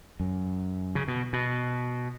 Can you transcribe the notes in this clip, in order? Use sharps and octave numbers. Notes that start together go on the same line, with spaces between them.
F#2
C#3
B2
B2